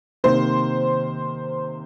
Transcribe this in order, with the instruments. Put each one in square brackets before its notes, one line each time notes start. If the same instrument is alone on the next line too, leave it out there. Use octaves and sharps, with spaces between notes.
[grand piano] C3 D#3 A#3 [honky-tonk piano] C5